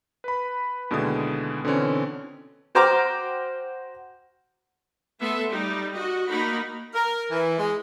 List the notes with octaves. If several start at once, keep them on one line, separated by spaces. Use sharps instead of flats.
B4 B5
D#2 B2 D3 G#3 E4 D#6
B2 D3 E3 C4 C#4
F#4 C5 G5 A#5 D6 F6
A3 B3 A4 E5 C6
G3 D#4
F#4 D#5
A#3 D#4 F#4 A#4 B5
A#4
E3
G#3